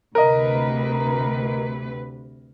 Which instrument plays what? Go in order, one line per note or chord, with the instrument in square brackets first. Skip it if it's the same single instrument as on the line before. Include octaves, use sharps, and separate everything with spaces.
[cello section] D2 C3 B4 [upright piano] A#4 D#5